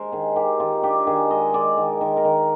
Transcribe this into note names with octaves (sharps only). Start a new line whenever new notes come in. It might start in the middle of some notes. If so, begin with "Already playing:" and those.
Already playing: G#3 A#4 C5
D#3 G#4
D#3 G4
D#3 F4
D4 G4
D#3 G#4
G#3 D#5
G#3 D5
D#3
D#3
A#4
D#3